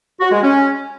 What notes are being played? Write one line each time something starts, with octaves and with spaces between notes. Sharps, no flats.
F#4
G#3
C#4